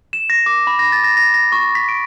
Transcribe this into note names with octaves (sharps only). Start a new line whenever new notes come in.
E7
A#6
D6
B5
A#6
A6
A#6
A#6
A#6
C#6
B6
D7